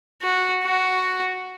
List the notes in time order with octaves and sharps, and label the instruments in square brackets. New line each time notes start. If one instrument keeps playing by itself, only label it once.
[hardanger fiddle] F#4
F#4